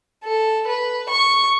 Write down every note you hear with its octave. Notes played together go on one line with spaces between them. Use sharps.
A4
B4
C#6